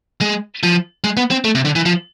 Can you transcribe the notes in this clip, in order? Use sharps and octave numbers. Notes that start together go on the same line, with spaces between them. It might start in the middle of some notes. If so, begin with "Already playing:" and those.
G#3
F3
G#3
B3
C4
A3
C3
D3
E3
F3